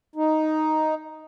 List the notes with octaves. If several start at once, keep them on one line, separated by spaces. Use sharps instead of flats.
D#4